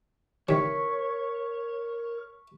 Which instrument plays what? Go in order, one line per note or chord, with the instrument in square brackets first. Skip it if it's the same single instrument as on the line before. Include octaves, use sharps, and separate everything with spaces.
[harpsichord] C3 D#3 E3 [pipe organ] A#4 [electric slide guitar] C#5 [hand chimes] C#6 B6 C#7